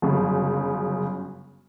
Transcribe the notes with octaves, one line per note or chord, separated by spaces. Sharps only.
G1 F#2 C#3